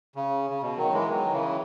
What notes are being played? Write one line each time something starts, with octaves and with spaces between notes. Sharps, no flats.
C#3
C#3
B2
D#3 F#3
E3 G#3
D#3 F#3
C#3 E3